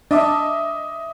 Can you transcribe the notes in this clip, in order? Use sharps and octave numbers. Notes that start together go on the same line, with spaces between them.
D4 D#5 E5 D6